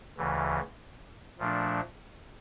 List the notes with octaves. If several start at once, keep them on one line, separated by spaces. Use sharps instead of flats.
D2 C#3 E3
A#2 F3 A3 D4